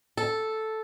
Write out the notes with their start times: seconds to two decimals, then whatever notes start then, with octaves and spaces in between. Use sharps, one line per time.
0.17 A4